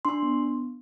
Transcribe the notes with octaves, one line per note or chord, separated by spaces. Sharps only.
D4 C6
B3